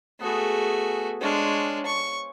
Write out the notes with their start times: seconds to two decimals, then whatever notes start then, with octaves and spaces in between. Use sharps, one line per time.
0.21 A3 B3 F#4 G#4
1.21 G#3 D4 C5 C#5 F5
1.86 C#6